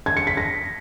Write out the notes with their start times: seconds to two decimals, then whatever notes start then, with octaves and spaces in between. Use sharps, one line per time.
0.06 G#6
0.17 C#7
0.27 B6
0.37 A#6